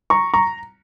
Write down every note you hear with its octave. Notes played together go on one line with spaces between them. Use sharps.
A#5 C#6
A#5 C#6